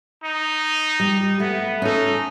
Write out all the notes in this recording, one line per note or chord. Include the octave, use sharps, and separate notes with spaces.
D#4
G3
A3 B3
C#4 D#4 A4